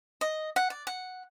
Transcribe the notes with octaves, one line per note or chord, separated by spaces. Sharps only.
D#5
F#5
D5
F#5